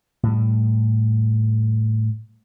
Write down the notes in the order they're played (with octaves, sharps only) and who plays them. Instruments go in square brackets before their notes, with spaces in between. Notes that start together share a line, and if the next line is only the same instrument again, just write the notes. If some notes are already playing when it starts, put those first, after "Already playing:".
[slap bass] A2 G3